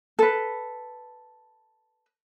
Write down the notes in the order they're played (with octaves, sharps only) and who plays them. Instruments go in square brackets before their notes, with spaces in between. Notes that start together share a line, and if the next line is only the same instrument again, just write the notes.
[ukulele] A4 B4